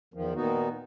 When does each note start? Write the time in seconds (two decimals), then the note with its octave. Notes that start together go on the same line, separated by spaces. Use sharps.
0.14 E2 D#3 F3
0.35 A#2 D#3 B3 D#4 F#4